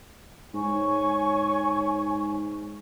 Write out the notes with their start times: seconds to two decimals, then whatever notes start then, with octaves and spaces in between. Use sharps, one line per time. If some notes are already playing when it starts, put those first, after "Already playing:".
0.54 G#2 C#5 G#5 C#6